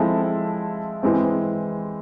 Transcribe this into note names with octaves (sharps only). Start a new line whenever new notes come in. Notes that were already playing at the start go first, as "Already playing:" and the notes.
Already playing: F3 G#3 C4 E4 A4
E3 G#3 C4